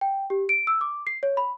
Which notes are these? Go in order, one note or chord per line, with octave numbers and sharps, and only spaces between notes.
G5
G4
D7
E6
D6
C7
C#5
B5